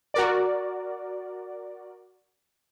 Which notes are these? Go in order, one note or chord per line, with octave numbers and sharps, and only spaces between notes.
F#4 A#4 D5